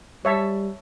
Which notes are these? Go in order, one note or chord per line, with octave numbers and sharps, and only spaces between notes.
G3 C#5 E5 A5